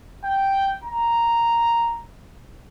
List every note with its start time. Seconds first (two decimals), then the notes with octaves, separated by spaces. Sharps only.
0.24 G5
0.84 A#5